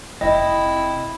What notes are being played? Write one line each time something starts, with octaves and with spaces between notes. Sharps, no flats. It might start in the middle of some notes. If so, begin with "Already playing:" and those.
F1 C4 E4 D#5 G5